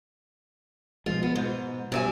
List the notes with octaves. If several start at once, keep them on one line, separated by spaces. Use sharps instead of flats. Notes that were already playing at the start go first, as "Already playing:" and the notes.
B2 F3 G#3 F4
B3
G#2 B2
G2 B2 F#3 E5 G#5